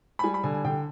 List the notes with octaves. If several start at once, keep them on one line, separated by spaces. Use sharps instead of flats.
B5
G3 G#5
B5
D3 G#5
G#5
D3 G5